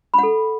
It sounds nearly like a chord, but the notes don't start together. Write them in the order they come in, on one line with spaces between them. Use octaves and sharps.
B5 F#5 A4